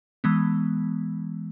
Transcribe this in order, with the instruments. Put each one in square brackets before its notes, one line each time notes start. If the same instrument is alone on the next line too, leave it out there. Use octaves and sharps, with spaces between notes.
[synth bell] E3 G#3 B3